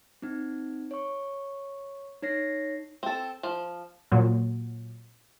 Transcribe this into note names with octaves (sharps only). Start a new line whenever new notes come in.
C4 D#4
C#5 C#6
D#4 C#5 A#6 C7
C4 A4
F3
A#2 F#3